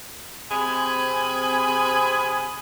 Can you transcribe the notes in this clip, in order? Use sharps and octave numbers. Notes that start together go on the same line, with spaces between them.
C3 C4 G#4 G#5 B5